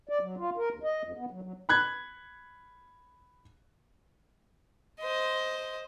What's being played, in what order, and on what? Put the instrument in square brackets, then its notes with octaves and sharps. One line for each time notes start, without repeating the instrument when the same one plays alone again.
[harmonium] D5
F#3
F4
A#4
D#2
D#5
F2
B3
F#3
F#3
[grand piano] B5 F#6 G#6
[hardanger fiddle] C5 D#5